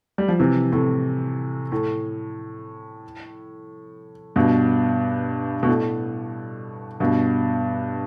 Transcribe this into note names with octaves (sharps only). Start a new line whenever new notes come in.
G3
F3
C3 E3
A2 C3
A2
G2 B2
B2
A2
G2 B2